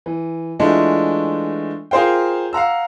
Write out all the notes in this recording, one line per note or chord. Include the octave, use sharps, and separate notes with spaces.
E3
E3 G#3 A3 D4 F4
F4 G#4 A#4 C5 F5 G5
F5 F#5 A#5 E6